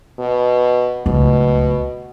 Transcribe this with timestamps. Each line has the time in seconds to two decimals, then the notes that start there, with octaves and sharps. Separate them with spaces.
0.19 B2
1.06 D1 C#2 B2